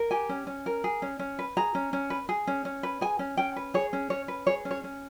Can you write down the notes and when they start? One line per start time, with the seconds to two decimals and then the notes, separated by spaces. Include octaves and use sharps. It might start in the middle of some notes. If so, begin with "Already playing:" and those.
Already playing: A#4
0.11 G4 G#5
0.29 C#4
0.47 C#4
0.66 A#4
0.84 G#4
1.02 C#4
1.19 C#4
1.39 B4
1.57 G#4 A#5
1.75 C#4
1.93 C#4
2.10 B4
2.29 G#4
2.47 C#4
2.65 C#4
2.83 B4
3.01 G#4 G#5
3.19 C#4
3.37 C#4 G5
3.56 B4
3.74 G#4 C#5
3.93 C#4
4.10 C#4 C#5
4.28 B4
4.47 G#4 C#5
4.65 C#4
4.71 C#5
4.84 C#4